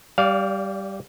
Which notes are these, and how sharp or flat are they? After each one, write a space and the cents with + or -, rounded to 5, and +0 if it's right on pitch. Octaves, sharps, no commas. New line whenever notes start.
G3 +0 D5 -35 F5 +0